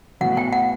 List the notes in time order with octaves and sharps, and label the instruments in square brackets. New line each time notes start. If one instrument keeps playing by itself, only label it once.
[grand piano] A2 E3 B3 F#4 [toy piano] F#5
[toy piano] G5
F#5